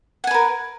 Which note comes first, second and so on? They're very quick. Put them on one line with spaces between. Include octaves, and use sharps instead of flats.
F#5 G#5 B4 A#4